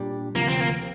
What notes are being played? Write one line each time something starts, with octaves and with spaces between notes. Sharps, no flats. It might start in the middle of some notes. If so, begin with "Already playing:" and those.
Already playing: A#2 G3 D4 G4
D2 C3 F3 A#3
C4
A#3